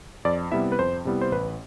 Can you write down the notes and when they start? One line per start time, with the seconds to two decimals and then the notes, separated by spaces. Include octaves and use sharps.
0.25 F2 D5
0.51 C3 G3 B3 E4 E5
0.72 B4
0.79 F2 C5
1.05 C3 G3 B3 E4
1.21 C5
1.31 A1 B4